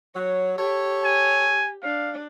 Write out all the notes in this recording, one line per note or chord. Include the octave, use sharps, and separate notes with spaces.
F#3 C#5
G4 A4 C#5
G#5
D4 F5